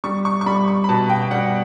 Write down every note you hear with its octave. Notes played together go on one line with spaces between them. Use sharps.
G3 C#6
C#6
C#6
G3 B5
C#6
B5
B2 A5
G5
G3 F#5